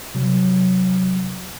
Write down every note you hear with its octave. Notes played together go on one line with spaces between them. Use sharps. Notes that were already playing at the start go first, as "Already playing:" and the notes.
C3 F#3